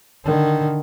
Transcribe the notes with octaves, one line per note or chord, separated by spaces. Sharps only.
D3 D#3